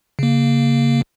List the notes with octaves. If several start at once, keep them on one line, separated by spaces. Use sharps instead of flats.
C#3 A#3